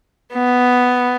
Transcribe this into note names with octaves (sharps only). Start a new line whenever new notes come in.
B3